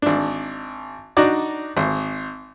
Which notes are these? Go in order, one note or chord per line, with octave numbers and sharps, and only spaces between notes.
G#1 D4
D4 D#4 F#4 D5
G#1